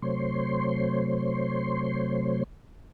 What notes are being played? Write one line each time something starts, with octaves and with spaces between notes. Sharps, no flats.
C3 F#3 A3 C5 C#5 C6